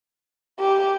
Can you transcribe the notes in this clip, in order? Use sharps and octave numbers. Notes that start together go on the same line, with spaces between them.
G4